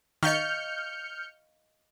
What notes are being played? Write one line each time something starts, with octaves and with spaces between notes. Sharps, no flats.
D#3 D#5 F5 C#6 F6 G6 C#7